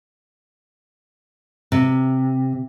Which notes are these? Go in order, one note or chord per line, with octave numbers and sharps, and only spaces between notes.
C3